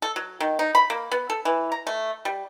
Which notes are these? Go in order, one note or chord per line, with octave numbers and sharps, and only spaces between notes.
A4
F#3
D#3
D#4
B5
A#3
B3
A4
E3
A#5
A3
G3